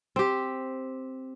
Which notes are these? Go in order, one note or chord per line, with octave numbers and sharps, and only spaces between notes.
C4 G4